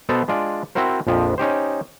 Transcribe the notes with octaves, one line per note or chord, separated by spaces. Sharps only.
B2 B3 A4 C5 A5 A#5
G#3 D4 F4 D5
C4 E4 F#4 A#4 C5
A#1 F2 F3
C#4 D#4 G4 C5